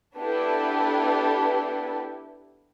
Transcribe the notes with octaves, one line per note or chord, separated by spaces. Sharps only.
B3 D4 E4 G4 A4 B4